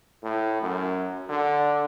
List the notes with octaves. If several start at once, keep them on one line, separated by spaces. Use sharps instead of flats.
A2
F#2
D3